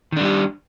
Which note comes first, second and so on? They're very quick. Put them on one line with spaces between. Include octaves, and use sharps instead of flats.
D#3 D4 G3 G4